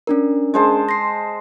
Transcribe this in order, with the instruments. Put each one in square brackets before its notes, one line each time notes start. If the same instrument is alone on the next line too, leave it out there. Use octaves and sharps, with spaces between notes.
[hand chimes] C#4 D4 A#4
[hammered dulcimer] G#3 C5 A5
[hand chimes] A#6 C7